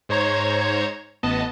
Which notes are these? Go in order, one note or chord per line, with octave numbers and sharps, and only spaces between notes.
G#2 C5 C#5 A#5 G#6
A1 B3 D#5 A5